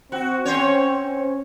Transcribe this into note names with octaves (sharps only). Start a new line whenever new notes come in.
C4 F#4
C4 C#4 C5 C#5
C#4